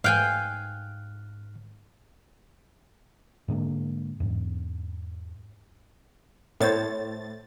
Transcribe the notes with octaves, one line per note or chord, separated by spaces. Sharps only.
G#2 F5 G5 G#5 F6 F#6
G#2 D3 G#3 A#3
E2 G#2
A2 C5 C#5 A6